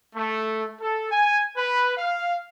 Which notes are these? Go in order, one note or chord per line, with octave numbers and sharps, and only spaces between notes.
A3
A4
G#5
B4
F5